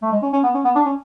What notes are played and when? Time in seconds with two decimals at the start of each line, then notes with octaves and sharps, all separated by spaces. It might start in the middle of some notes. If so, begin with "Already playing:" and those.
0.02 A3
0.12 G#3
0.23 C#4
0.33 C#4
0.44 B3
0.55 C#4
0.65 B3
0.75 D4
0.86 C#4